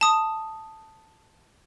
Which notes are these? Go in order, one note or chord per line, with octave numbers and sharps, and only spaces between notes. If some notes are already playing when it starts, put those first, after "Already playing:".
A5 D#6